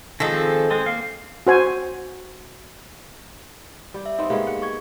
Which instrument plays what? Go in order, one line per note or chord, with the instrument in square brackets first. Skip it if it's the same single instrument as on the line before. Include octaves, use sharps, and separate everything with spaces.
[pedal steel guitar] D#3 F3 C4 [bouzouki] G#3 A4
[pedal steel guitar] G#3 C4
A#3 F5
[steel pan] F#4 C5 G#5
[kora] G3 G4
[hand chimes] E5
[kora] B3 C4 D#4
[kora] G#3 A#3 B3 [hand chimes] G4 F5
[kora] F#5
[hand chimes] C#6 G#6